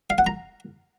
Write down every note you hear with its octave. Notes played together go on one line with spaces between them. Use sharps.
F5
F#5
A#5